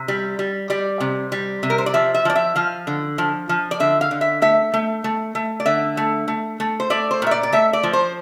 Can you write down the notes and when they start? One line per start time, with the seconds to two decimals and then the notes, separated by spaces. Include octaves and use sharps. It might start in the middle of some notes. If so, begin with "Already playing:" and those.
Already playing: C3
0.08 G3
0.39 G3
0.70 G3 D5
1.00 C3
1.32 G3
1.63 C3
1.70 A#4
1.78 C5
1.86 D5
1.94 F3 E5
2.14 E5
2.25 F3 D5
2.36 E5
2.56 F3 F5
2.87 D3
3.18 F3
3.49 F3
3.71 D5
3.80 D3 E5
4.01 F5
4.11 D3
4.21 E5
4.42 A3 E5
4.74 A3
5.04 A3
5.35 A3
5.60 D5
5.66 D3 E5
5.97 A3
6.28 A3
6.60 A3
6.80 C5
6.90 A3 D5
7.11 C5
7.22 A#2 E5
7.31 D5
7.43 D5
7.52 A3 E5
7.73 D5
7.83 F3
7.93 C5